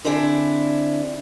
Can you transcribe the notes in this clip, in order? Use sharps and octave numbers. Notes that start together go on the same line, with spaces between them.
D3 C4 D4 E4 G#4